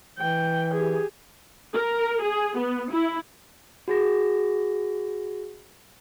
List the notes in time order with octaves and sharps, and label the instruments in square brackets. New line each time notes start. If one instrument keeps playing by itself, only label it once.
[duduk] E3 [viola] G5
[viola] G4 G#4
[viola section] A#4
G#4
B3
E4
[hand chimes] F#4 G#4 A#6